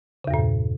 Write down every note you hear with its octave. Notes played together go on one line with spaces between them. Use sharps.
E2 G2 A#2 C#3